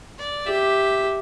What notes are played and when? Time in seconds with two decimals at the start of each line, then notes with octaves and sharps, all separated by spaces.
0.18 D5
0.46 G4 E5